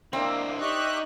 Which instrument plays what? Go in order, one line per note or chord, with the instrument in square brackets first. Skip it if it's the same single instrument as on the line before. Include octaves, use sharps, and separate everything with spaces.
[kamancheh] A#3 [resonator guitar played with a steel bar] C4 [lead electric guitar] D4 E4
[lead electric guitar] D#4 [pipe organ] G4 E5 F#6 [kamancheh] D5 C#6